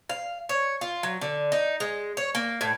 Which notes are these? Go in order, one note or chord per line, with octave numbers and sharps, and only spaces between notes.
F5
C#5
F4
F#3
D3
D#4
G#3
C#5
A#3
A2